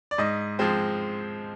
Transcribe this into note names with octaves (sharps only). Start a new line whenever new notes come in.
D5
G#2 D#5
F3 G#3 C4